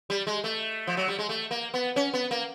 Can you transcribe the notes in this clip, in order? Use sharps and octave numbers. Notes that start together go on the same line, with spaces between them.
G3
G#3
A3
F3
F#3
G3
G#3
A3
A#3
B3
C#4
B3
A#3